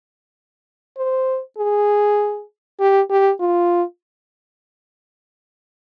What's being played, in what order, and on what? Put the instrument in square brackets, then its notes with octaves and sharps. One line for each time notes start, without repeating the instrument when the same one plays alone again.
[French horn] C5
G#4
G4
G4
F4